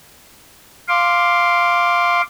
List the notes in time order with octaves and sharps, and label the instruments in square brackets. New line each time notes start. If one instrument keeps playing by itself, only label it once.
[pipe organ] F5 C6 D6